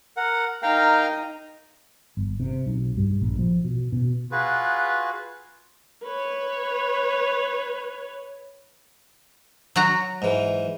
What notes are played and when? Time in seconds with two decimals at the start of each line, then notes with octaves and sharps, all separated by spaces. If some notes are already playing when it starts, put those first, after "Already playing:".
0.17 A#4 F#5
0.62 D#4 A#4 F5 G5 A#5
2.17 G1
2.40 C3
2.66 B1
2.97 G2
3.22 A#1
3.39 F3
3.64 B2
3.92 B2
4.32 F4 F#4 G#4 B4
6.03 B4 C#5
9.76 F#3 F#4 A#5
10.22 G#2 E3